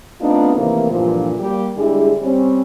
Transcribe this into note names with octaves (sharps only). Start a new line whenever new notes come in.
A3 B3 C4 D4 D#4 F4
C3 D#3 E3 A3 A#3
G2 A#2 D3 E3 F3
G3 A#3 G4
D3 G3 G#3 E4 G#4
G3 C4 C#4